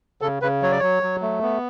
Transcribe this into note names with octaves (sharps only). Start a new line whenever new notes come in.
C#3 A4
C#3 B4
F#3 C#5
D5
F#3 C#5
F#3
A3
B3